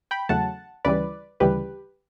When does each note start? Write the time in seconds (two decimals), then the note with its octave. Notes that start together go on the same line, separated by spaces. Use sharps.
0.11 G5 B5
0.29 E2 C#3 F#3 A3 F#5 A5
0.85 D2 C#3 E3 G3 B4 D5
1.40 D2 C#3 E3 G3 G4 B4